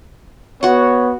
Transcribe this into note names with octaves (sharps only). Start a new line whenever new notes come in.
B3 F#4 C#5 F#5